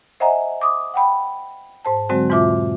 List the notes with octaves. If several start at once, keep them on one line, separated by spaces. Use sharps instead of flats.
C5 D#5 E5 F#5 G#5 A#5
D6 D#6
F#5 G5 B5
G#2 C5 A5
D3 F#3 G#3 C4 F#4 C5
E2 G#2 B2 F4 E5 D6